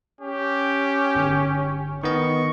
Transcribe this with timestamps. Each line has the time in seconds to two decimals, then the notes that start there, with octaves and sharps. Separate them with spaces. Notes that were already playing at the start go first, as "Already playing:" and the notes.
0.21 C#4 G4
1.15 G1
2.03 D#3 B3 D#5 C#6